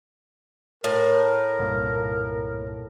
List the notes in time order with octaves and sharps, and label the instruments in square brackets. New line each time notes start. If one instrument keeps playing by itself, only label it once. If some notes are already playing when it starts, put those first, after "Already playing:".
[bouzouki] A2 [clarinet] A#4
[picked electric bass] C2 G2 A#2